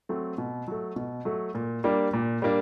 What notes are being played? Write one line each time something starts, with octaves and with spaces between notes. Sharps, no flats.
F#3 A3 C4
B2
F#3 A3
B2
F#3 A3
A#2
G3 A#3 D4
A#2
G3 A#3 D4